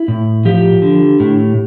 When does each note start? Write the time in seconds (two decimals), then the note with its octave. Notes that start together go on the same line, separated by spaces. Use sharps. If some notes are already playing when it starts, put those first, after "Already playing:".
Already playing: E4
0.08 A2
0.45 F3 G4
0.82 D3
1.20 A2